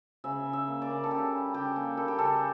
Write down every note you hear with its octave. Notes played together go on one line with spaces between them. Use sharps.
C#3 E5
C#3
E5
A#3
D5
C#3
A4
C#3 G4
G3
C#3 G4
A#3
G3 A4
G4
C#3 A4